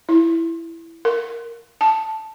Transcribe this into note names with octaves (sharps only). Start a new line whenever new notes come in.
E4
A#4
A5